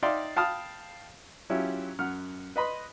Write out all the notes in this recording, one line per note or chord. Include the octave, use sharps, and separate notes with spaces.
D#4 D5 E5 F5 G5 C6
F5 G5 A5 B5 D#6 F6
F#3 C#4 E4 F4 G4
F#2 F#5 F6
B4 D#5 B5 C6